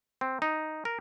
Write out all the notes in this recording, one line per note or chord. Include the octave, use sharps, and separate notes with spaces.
C4
D#4
A#4